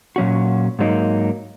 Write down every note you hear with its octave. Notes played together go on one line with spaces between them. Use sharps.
A#2 F#3 C#4 F#4
G#2 F#3 A#3 D#4